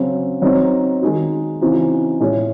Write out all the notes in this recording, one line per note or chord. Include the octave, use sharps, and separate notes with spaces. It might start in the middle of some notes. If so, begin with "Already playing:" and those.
Already playing: C#3 F#3 C4
F#3 C4 D#4
D#3 G#3 D#4 F#4
C#3 E3 C4 D#4 F#4
A2 G#3 C#4